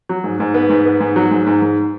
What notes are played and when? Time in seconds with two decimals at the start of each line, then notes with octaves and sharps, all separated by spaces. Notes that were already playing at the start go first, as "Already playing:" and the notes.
0.09 F#3
0.24 G#2
0.40 G#2
0.54 B3
0.70 G#2
0.86 B3
1.00 G#2
1.16 F#3
1.31 G#2
1.47 G#2
1.62 G#2